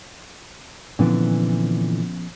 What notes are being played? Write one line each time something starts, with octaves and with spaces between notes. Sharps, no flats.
A#2 D3 E3 F3 B3 C#4